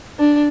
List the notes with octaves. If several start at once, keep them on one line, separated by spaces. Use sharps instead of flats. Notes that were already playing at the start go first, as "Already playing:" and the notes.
D4